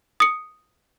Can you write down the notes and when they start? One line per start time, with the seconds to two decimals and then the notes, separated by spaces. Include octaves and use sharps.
0.20 D#6 C#7